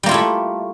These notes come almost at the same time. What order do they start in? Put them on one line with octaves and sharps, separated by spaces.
G3 A#3 F4 E4 A3